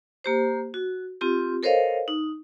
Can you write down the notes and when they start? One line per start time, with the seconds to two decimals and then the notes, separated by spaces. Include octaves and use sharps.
0.24 A#3 G4 C5
0.74 F#4
1.21 C4 F4 G4
1.63 A4 A#4 C5 C#5 D#5 F5
2.08 D#4